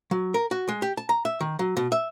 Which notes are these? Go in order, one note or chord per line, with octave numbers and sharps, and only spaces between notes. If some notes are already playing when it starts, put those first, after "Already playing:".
F#3
A#4
F#4
G#3
G4
A5
A#5
E5
D#3
F#3
B2
E5